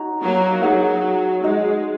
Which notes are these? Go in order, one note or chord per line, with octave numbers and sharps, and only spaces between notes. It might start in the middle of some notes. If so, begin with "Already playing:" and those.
Already playing: D#4 F#4 C#5 A#5
F#3 A#3
F#3 D#4 G#4 F#5
G#3 D#4 F#4 D#5